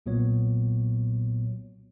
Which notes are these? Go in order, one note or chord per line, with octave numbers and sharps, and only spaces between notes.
B1 A#2 F#3 B3 C#5